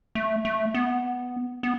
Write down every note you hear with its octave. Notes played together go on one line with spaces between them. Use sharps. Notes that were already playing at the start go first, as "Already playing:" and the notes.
A3
A3
B3
B3